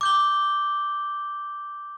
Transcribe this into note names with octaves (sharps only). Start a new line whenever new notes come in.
D6 G6 G7